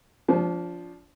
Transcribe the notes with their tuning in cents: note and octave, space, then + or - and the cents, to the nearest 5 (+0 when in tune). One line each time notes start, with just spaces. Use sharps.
F3 +0 D4 -25 A5 -40